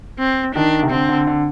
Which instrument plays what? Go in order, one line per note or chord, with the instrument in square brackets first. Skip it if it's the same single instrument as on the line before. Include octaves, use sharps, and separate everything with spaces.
[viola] C4
[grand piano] D#3 [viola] D4
[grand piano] C3
[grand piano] D3 [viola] C4
[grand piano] D3
D3